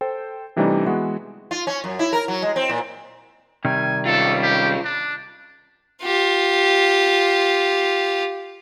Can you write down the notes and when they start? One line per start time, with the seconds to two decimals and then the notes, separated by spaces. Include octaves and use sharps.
0.01 A4 C5 G5
0.56 C3 E3 G3 A3 D4 D#4
0.86 E3 G#3 B3 F#4
1.51 F4
1.67 C#4
1.84 F#2
1.99 E4
2.13 A#4
2.28 F#3
2.42 G#3
2.56 C4
2.69 A#2
3.65 C3 D#3 G3 G#5
4.06 C#4 F4 A4
4.42 G4
4.84 D4
6.03 F4 G4